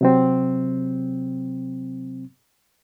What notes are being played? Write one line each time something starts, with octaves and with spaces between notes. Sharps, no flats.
C3 F#3 C4